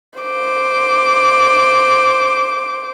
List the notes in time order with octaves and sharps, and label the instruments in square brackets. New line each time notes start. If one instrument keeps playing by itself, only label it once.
[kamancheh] C5 D6